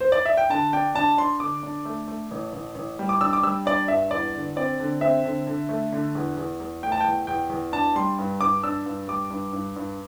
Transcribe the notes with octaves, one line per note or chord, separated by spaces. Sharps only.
C5
D5
E5
G5
D3 A5
D4 G5
D4 A5
D4 C6
D3 D6
D4
A3
A3
A1
A1
A1
G3
D6
D4 E6
D6
G3 E6
D4 D5
G2 E5
E2 D5
D3
C4 D5
D3
C4 E5
D3
D3
A3
D3
E2
E2
E2
A3 G5
A5
E2 G5
E2 G5
E2
D4 A5
G3 C6
G2
G2 D6
D4 E6
G2
G3 D6
G2
G2
G2